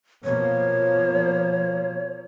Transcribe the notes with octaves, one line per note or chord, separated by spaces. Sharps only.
B2 F3 A#3 C#5